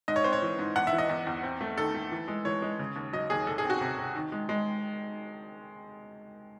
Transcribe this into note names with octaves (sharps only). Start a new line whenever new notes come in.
G#2 D#5
C#5
C4 C5
C#5
E3
G#2
E2 F#5
E5
E3
D#5
E2
E2
C4
A3
D#3 A4
A3
E3
G#3
E3 C#5
G#3
C#3
D#2
F#3 D#5
D#2 G#4
C2 A4
G#4
C4
F#4
C3
C3
D#3
G#3
G#3